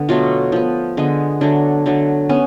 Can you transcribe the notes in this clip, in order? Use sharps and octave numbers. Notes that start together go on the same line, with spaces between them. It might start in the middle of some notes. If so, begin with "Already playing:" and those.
Already playing: D3 B3
B2 F#3 A3 F4
F3 B3
D3 G#3 B3
D3 F#3 A3 D4
D3 F#3 A3
B3 C#4